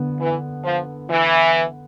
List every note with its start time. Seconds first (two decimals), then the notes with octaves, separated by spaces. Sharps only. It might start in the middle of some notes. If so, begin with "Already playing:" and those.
Already playing: D3 B3
0.21 E3
0.65 F3
1.10 E3